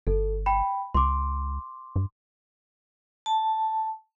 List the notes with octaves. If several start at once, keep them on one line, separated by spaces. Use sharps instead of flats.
G1 A4
G5 B5
C#2 C6 D6
G2
A5